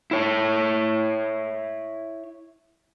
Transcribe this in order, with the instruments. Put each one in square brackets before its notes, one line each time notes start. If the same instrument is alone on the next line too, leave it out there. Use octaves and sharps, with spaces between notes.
[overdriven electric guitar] E4 C#5